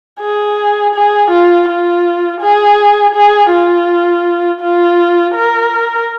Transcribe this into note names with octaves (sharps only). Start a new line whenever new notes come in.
G#4
G#4
F4
F4
G#4
G#4
F4
F4
A#4